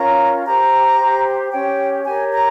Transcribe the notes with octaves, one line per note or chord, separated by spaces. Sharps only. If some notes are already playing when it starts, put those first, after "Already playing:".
Already playing: C#4 F4 A#4 C#5 A#5
G4 C5 A#5
G4 C5
C#4 G4 C#5 G5
G4 A#4 C#5 G#5
A#5